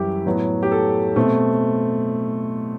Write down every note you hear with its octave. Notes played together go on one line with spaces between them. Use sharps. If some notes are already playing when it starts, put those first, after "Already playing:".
Already playing: F#2 E3 G3 E4 G4
A2 F#3 B3
G4
A4
B2 A3 C4